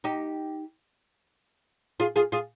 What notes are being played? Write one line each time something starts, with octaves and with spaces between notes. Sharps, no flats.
D#4 G4
F4 G#4
F4 G#4
F4 G#4